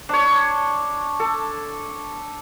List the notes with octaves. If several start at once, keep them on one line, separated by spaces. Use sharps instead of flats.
D4 C#5
A4